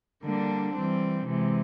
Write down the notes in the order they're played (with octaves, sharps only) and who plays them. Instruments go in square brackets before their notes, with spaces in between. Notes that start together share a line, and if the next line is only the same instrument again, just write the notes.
[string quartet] D3 G3 A#3 D4
E3 G3 C4
C3 E3 G#3